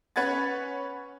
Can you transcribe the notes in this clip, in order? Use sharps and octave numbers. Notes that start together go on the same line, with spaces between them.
C#4 B4 F#5 G#6 A6